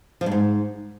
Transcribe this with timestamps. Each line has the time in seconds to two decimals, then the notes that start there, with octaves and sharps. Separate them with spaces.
0.21 F3
0.26 G2
0.31 G#2